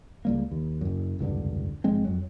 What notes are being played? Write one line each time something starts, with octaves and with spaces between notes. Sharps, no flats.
C#2 G3 A#3
D#2
F#1 F#2
F1 C#2 G2 D3
G#1 F3 G#3 C4
F2 F#3